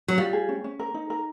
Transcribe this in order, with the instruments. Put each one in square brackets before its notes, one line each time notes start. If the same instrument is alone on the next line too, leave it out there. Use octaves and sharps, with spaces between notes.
[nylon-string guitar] F#3
[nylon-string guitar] G3 [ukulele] F4
[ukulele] G#4
C#4
C#4
A#4
D#4
A#4